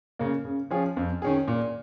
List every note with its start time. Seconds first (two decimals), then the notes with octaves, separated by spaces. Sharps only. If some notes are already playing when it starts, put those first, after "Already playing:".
0.19 C#3 A#3
0.45 C#3
0.70 F3 C#4 F4 G#4
0.97 F2
1.22 D#3 C#4 G#4
1.48 A#2